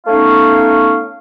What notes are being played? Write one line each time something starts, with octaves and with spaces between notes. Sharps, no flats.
A3 B3 C#4 D#4 C#5 F5